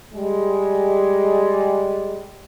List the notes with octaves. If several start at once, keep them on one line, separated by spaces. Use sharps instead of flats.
G3 G#3